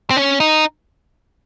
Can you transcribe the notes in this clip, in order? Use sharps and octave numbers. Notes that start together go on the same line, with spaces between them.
C4
C#4
D#4